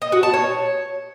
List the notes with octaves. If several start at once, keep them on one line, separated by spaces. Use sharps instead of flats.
D#5
F#4
A5
C#5